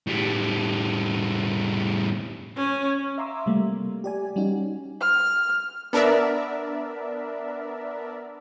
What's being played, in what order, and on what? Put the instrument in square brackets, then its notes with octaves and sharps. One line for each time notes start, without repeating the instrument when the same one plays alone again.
[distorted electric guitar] A2 G3
[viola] C#4
[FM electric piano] E5 F5 A#5 C6 D6 E6
C3 G3 A3 A#3
G4 D5 G#5
G3 C#4 D#4 F#4
[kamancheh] F6
[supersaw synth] B3 D4 A#4 D5 E5